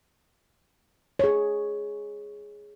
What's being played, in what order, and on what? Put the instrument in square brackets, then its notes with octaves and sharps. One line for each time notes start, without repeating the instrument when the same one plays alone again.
[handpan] G#4 C#5